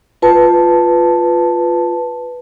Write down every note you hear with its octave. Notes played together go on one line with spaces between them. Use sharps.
F4 B4 A5